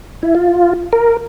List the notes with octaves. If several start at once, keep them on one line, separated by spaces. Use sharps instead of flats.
E4
F4
A#4